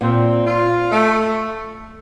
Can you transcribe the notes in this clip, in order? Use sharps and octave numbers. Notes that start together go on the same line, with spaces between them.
A#2 C4
F4
A3